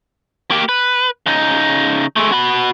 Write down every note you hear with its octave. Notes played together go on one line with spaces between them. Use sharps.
A#3 G4
B4
C#3 D#4
G#3 A3
F#4 B5